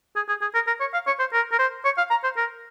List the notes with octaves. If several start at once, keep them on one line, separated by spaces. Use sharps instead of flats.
G#4
G#4
G#4
A#4
A#4
C#5
F5
C#5
C5
A#4
A#4
C5
C#5
F5
A#5
C5
A#4